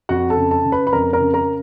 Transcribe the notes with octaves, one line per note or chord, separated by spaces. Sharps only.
F2 F#4 F#5
A4 A5
C#3
A4 A5
C#3
B4 B5
B5
F2 A#4 A#5
A#4 A#5
C#3
A#4 A#5